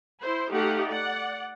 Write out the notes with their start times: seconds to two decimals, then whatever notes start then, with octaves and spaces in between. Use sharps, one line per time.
0.22 E4 C5
0.52 A3 D#4 G4 F5 F#5
0.87 D5 F#5